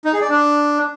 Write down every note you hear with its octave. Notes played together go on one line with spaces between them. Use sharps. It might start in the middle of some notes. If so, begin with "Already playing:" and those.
D#4
G#4
D5
D4